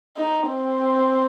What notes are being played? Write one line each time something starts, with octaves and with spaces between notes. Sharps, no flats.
D#4
C4